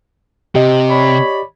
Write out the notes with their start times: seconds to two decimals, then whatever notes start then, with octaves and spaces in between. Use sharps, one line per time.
0.55 C3 G4 D#5
0.89 C#5 D5 B5